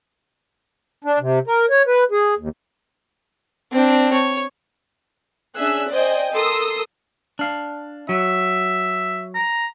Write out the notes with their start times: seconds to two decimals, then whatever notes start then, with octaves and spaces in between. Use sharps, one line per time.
1.04 D4
1.20 C3
1.47 A#4
1.70 C#5
1.87 B4
2.11 G#4
2.39 D#2
3.72 C4 D4
4.13 C#5
5.55 C#4 D4 G#4 E5 E6 F#6
5.89 C5 D5 D#5 G5 G#5
6.33 A4 A#4 C6 D#6 E6
7.39 D4 F5
8.09 F#3 E5
9.35 A#5